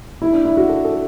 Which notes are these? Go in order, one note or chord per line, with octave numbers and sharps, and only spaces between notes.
E4
D4
E4
F#4
A4
A4